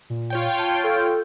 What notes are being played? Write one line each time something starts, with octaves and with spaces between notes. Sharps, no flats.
A#2
F4 C#5 G5
A5
A4